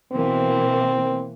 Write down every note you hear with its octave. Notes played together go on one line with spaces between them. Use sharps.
B2 E3 A#3 C4